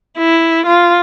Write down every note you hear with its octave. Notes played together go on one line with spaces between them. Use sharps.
E4
F4